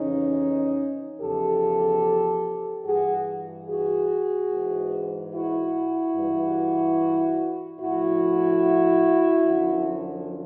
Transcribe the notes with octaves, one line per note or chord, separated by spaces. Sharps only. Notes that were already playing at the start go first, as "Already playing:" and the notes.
Already playing: F2 C#3 E3 C#4 D#4
E2 C#3 F3 G4 A4
G2 E3 F#4 G#4
F#4 G#4
G#2 E3
E4 F#4
G2 E3
A2 F3 E4 F#4
F#2 D3 F3